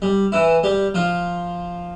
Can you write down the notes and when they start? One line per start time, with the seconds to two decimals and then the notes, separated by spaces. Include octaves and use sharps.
0.02 G3
0.32 E3 E4
0.63 G3 G4
0.94 F3 F4